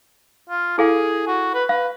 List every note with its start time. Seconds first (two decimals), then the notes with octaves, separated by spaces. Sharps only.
0.50 F4
0.78 E4 G#4 A4 F5
1.27 F#4
1.54 B4
1.69 B4 F5